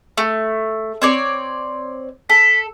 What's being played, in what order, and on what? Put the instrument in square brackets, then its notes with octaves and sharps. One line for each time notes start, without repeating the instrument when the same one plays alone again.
[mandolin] A3
C4 C#5 D5
[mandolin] A4 [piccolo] B6